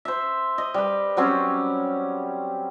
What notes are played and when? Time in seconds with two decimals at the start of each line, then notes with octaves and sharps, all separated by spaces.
0.05 C5 E5
0.58 D#5
0.74 G3 B4
1.17 F#3 G3 C4 C#4